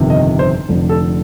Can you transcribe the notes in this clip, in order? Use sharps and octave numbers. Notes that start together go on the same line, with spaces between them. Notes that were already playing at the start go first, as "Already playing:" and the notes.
Already playing: G1 F2 C3 D#3
D#5
C5
F1 F2 D3
A4